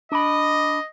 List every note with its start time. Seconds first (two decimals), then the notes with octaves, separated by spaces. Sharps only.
0.12 D4 D#5 B5